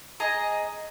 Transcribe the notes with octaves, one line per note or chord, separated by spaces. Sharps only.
G#4 D#5 A#5